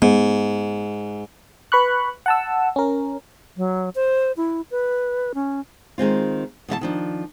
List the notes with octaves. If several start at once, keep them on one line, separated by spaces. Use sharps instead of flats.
G#2 B3
B4 B5 C#6 F#6
F#5 A5 E6
C#4 A#4
F#3
C5
E4
B4
C#4
D#3 G#3 C4 F4
B2 E3 E5 A5
D#3 F3 D4